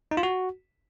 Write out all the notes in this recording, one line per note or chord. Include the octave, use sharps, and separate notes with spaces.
D#4
F4
F#4